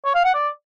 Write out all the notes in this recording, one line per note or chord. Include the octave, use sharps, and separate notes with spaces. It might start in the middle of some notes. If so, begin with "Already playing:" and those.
C#5
F5
F#5
D5